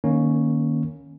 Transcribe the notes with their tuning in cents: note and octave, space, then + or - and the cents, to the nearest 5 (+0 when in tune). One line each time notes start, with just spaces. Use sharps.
D#3 -20 A#3 +10 C#4 +0